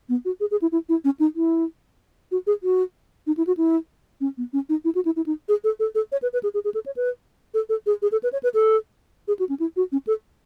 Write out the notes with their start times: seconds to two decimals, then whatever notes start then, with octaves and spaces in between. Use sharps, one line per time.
0.09 B3
0.25 F#4
0.40 G#4
0.51 G#4
0.62 E4
0.72 E4
0.89 E4
1.05 C#4
1.20 D#4
1.36 E4
2.31 F#4
2.47 G#4
2.63 F#4
3.27 D#4
3.37 E4
3.47 F#4
3.57 E4
4.21 C#4
4.37 B3
4.53 C#4
4.69 D#4
4.85 E4
4.95 F#4
5.05 E4
5.16 E4
5.26 D#4
5.49 G#4
5.64 A4
5.80 A4
5.95 A4
6.12 C#5
6.22 B4
6.33 B4
6.43 G#4
6.54 G#4
6.65 G#4
6.74 A4
6.86 C#5
6.97 B4
7.54 A4
7.69 A4
7.86 G#4
8.02 G#4
8.12 A4
8.23 B4
8.33 C#5
8.43 B4
8.54 A4
9.28 G#4
9.39 F#4
9.49 C#4
9.60 E4
9.76 F#4
9.92 C#4
10.07 A4